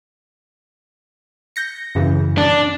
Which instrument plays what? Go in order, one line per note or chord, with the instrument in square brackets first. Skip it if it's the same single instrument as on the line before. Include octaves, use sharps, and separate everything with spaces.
[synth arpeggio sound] G6 A#6 C#7
F#2 C#3 E3
[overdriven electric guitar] D4